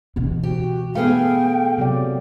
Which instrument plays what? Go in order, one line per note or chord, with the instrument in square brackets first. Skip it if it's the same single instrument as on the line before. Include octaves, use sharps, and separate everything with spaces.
[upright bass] B2 E3
[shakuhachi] F#4 [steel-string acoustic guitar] G4
[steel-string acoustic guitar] A3 G#4 [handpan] B3 B4 F5 [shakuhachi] G5
[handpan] C3 F#3 D5